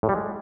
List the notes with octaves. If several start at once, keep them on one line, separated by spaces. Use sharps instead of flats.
A2
G3
G#3